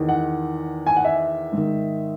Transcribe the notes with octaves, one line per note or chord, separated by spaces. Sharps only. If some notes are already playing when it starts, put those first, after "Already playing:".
Already playing: E2 D#3
F#5
G#5
F#5
E5
G#2
D#3